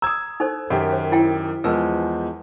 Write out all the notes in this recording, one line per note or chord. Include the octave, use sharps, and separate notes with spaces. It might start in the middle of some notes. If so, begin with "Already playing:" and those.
A#5 D#6 E6 G#6
D#4 A4 C5
F#2 D#3 G4
C5
E4 G5
E2 F3 G#3 A#4 B4 E6